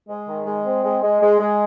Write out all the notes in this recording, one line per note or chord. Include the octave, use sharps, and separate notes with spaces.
G#3
D#3
G#3
C4
G#3
G#3
G#3
G#3